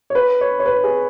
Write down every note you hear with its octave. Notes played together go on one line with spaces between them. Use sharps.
C#5
B4
C#5
C#5
B4
G#4